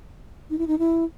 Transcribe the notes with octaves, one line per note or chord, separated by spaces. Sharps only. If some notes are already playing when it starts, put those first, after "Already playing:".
D#4
E4
D#4
E4